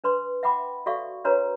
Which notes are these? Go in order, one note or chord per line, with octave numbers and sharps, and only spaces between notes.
D4 B4 C6
E5 F#5 G5 B5 D6
F#4 A4 D5 E5 F5 C#6
D4 F#4 A#4 B4 C#5 A#5